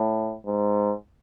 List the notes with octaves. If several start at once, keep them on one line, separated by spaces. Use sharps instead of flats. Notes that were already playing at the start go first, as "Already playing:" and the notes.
Already playing: A2
G#2